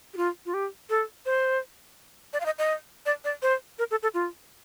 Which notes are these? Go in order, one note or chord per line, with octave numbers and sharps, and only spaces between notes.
G4
F4
F4
G4
A4
C5
D5
F5
D#5
D#5
D5
D5
C5
A#4
A4
A4
F4